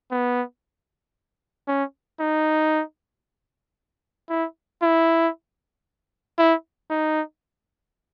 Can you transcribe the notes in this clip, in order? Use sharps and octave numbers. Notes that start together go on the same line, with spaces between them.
B3
C#4
D#4
E4
E4
E4
D#4